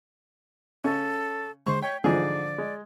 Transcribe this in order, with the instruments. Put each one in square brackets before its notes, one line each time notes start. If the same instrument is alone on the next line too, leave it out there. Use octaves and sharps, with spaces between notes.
[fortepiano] C#3 C#4 [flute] A4
[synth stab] D#2 D3 G#3 [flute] C5 [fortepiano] C#6
[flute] C#5 [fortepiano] G5 [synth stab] G6 B6
[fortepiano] G#2 G#4 [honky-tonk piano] D3 F3 [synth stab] E3 G3 F4 [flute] D5
[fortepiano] G#3